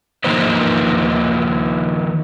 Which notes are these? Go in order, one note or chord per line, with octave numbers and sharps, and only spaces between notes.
D#3 F3 A#3 D#4 B4 C5